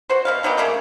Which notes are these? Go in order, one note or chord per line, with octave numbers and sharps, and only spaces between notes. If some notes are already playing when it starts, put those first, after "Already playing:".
F#4 C5
B2 B3 F5
D#3 F#3 B3 G4
C#3 A3 A#3 G4